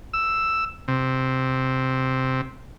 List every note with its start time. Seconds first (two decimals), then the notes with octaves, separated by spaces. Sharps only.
0.13 E6
0.88 C3